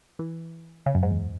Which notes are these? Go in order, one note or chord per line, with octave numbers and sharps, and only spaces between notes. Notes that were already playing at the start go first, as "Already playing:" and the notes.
E3
C#3
F#2
G#2
E2